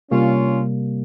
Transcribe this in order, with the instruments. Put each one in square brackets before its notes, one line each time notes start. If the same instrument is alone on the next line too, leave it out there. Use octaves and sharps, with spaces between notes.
[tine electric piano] C3 G3 A#3 [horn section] C#4 F4